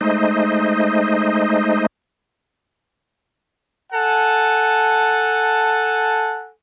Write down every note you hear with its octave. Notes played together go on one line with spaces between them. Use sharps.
G#3 A3 D#4 C5 D#5
A4 F#5 G#5 A5